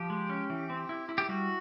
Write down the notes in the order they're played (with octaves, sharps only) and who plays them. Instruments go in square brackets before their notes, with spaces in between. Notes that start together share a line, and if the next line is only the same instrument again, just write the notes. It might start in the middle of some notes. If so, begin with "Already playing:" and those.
Already playing: [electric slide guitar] F3 [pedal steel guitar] G4
[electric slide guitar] G#3
C#4
E3
C4
E4
E4
[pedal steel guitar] G4
[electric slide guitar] G3 [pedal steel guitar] F#4